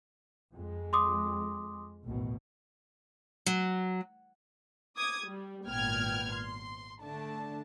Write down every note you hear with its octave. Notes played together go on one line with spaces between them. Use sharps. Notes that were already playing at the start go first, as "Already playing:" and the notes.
F2 G#3
C6 D6 D#6
A1 D#2 B2
F#3
D6 D#6 G#6
G3
G#1 A#2 B3 G5 F6 G#6
C6
D3 A3 D4 A5